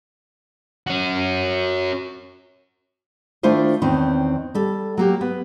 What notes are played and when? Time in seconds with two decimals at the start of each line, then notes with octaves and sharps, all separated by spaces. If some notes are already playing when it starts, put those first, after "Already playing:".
0.87 C#4 F#4
3.43 D#3 A3 D4 E4 F4 C5
3.82 E2 D#3 C4 C#4
4.55 G3 A4
4.98 F#3 A#3 G4
5.21 B3